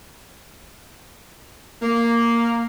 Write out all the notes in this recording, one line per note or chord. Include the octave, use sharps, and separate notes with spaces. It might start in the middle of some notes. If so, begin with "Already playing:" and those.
A#3